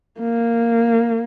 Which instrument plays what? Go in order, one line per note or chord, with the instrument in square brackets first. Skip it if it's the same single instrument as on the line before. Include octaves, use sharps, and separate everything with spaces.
[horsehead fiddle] A#3